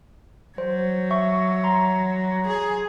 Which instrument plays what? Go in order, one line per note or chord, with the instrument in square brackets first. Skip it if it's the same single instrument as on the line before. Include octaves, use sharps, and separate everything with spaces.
[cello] F#3 [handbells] C5
[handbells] E5 C#6
A#5 C6
[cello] G#4